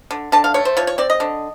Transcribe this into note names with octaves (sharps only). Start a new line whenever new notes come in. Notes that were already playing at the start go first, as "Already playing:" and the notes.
D3
D3 A5
F5
A3 C#5
C5
F3 C#5
C#5
C4 D5
D#5
D3